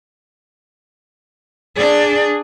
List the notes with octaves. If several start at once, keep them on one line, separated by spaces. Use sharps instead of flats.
D4 G#4 D5